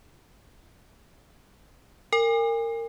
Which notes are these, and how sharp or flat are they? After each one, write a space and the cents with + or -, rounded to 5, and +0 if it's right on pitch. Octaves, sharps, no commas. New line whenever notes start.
A#4 -25 G#5 -40